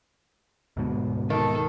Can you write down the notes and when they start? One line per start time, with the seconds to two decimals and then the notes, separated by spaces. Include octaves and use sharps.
0.77 D2 G#2 B2
1.30 D#3 A4